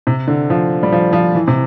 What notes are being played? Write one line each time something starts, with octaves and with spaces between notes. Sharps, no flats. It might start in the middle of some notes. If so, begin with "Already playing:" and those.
C3
D3
F3
G3
F3
F3
E3
C3